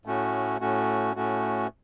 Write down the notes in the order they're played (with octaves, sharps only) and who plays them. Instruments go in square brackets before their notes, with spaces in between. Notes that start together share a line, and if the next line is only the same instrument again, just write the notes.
[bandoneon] A2 A3 C#4 F#4
A2 A3 C#4 F#4
A2 A3 C#4 F#4